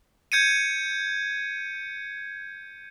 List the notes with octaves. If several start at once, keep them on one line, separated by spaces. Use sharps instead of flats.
G6 G#6 C#7 D#7